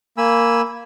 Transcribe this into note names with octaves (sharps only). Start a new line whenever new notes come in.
A#3 G#5 B5 E6